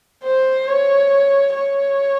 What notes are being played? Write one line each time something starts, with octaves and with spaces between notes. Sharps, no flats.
C5
C#5
C#5